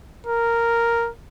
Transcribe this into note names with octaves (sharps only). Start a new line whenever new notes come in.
A#4